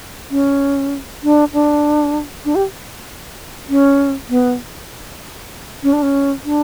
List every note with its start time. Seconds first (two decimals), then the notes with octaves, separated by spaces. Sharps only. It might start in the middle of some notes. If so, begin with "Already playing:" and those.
0.31 C#4
1.23 D4
1.53 D4
2.45 D4
2.55 G4
3.69 C#4
4.29 B3
5.83 C#4
5.93 D4
6.03 C#4
6.44 D4